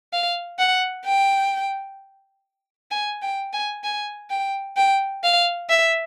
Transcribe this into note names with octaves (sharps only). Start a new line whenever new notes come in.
F5
F#5
G5
G#5
G5
G#5
G#5
G5
G5
F5
E5